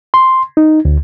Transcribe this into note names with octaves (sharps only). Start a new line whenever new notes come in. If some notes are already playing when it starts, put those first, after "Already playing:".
C6
D#4
D2